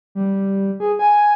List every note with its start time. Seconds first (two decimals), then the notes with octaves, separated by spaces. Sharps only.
0.15 G3
0.80 G#4
0.99 G#5